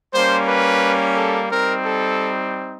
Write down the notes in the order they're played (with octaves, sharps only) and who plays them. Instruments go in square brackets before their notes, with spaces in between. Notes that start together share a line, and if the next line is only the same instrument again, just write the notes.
[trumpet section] G3 A#3 C#4 C5
B4
A4
G3 C4 D#4 A#4
A4